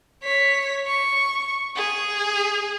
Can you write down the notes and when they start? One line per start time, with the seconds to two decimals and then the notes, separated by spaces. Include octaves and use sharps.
0.23 C#5 B6
0.86 C#6
1.76 G#4